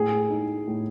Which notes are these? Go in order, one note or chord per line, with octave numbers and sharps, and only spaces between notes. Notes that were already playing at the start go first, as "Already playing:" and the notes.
Already playing: A2 G#4
D#4
A2